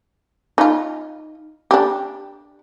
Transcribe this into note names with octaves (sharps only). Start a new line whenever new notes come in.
D#4 F4
D4 G4